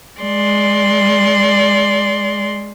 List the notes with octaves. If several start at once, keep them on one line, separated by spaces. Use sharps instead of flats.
G#3 D5 C6